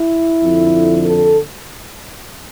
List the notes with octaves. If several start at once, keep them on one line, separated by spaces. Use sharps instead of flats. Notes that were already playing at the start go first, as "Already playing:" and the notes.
Already playing: E4
F2 D3
A4